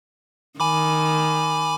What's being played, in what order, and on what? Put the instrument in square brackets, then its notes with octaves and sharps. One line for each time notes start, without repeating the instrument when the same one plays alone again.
[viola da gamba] D#3 [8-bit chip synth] G#5 B5 D6